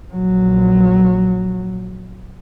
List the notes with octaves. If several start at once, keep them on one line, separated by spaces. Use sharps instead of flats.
A#1 F#3